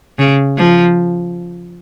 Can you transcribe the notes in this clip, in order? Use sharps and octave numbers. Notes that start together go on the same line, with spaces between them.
C#3
F3